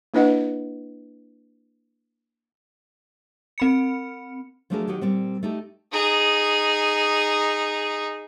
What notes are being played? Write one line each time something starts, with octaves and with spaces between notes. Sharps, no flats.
A#3 D4 E4 B4 D#5 F#5
C4 B5 C#7
F3 F#3 A3 D4 G#4 A#4
D#3 F#3 G4 D#5 F#5
A#2 G3 C4
A3 D#4 E4 G4 A4
D#4 G#4